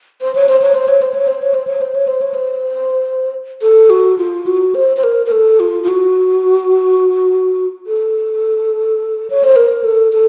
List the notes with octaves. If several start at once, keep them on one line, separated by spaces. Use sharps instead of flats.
C5
C#5
C5
C#5
C5
C#5
C5
C#5
C5
C#5
C5
C#5
C5
C#5
C5
C#5
C5
A4
F#4
F4
F#4
C5
C5
A#4
A#4
A4
F4
F4
F#4
A4
C#5
C5
A#4
A4
A4